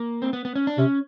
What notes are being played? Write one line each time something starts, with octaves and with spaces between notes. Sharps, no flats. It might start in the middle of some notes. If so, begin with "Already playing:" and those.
Already playing: A#3
C4
B3
B3
C#4
D4
C3 C#4